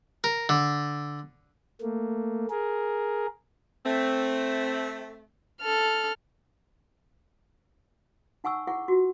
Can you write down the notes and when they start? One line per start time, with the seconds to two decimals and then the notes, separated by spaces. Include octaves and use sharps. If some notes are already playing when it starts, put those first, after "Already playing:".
0.24 A#4
0.49 D3
1.81 A3 A#3
2.50 G#4 A#4
3.86 A3 C4
5.62 A4 F6
8.44 D#4 F#5 G#5 C#6 E6
8.67 E4 G#4 F#5 C#6
8.88 F4 F#4